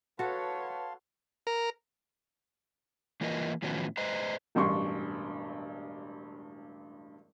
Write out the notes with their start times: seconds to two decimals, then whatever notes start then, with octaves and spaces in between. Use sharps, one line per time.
0.19 F#4 A4 B4 C#5 F5 F#5 A5 C6
1.47 A#4
3.21 E3 A#3 F4 A#4 B4 D#5
3.62 A2 D#3 F3 F#3 B3 C#4
3.97 B4 C5 D#5 A#5
4.55 E1 A1 G2 C6 C#6